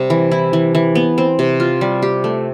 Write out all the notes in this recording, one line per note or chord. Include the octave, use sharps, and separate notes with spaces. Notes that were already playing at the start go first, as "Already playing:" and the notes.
Already playing: C3 G3
E3
E4
E3
E3
B3
C4
C3
F4
G3
G4
A3